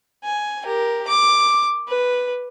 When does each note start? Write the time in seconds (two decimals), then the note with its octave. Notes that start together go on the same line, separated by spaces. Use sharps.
0.24 G#5
0.63 G4 A#4
1.08 D6
1.88 B4